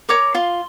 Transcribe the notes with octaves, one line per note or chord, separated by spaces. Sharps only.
A#4 C#5 D6
F4 C6